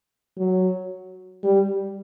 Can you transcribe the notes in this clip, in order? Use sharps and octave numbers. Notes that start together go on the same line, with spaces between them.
F#3
G3